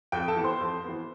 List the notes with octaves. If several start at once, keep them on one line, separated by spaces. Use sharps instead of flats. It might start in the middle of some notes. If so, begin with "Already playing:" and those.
F2 G5
A4 A5
E3 B3
C5 C6
F2
E3 B3